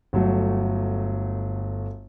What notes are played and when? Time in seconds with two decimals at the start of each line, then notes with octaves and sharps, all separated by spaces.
0.13 G1 F#3 A3